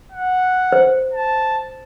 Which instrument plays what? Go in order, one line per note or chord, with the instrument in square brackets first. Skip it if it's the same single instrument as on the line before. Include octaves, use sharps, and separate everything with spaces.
[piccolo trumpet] F#5
[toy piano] C5
[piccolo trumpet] A5